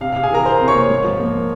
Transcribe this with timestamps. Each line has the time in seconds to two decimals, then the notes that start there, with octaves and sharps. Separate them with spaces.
0.01 C3 F5
0.12 F5
0.16 C3
0.23 G#4 G#5
0.31 E3 A#4 A#5
0.46 C3 C5 C6
0.60 C3
0.68 C#5 C#6
0.75 A#3
0.90 G#2
1.04 F3
1.19 A#3